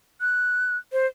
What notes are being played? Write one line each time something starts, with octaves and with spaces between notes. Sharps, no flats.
F#6
C5